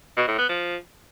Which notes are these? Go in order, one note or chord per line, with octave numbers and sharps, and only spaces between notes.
B2
A2
B3
F3